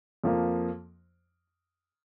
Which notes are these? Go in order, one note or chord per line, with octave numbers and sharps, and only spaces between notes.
F2 F3 A#3